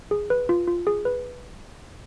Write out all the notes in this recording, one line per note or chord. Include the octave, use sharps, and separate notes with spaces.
G#4
B4
F4
F4
G#4
B4